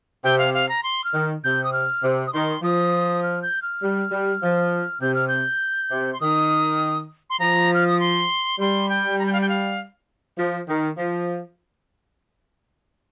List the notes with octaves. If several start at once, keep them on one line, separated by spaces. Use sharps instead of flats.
C3 G5
F5
F5
A#5
C6
F6
D#3
C3 G6
D#6
F6
C3
D#6
D#3 C6
F3 D#6
F6
G6
F6
G3
G3
F3
C3 G6
F6
G6
C3
C6
D#3 D#6
C6
F3 A#5
F6
D#6
C6
G3 C6
G5
A#5
G5
F5
G5
F5
F3
D#3
F3